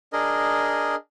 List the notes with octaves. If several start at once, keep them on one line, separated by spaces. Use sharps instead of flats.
D4 G#4 A#4 D#5